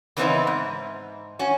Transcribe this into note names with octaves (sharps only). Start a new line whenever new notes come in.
C#3 E3 B3 C4 D#4 E4
G#2
C#4 F#4